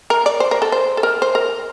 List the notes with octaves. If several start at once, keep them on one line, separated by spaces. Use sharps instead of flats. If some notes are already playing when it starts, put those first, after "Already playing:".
A#4
D5
C5
A#4
A4
C5
A4
A#4
C5
A#4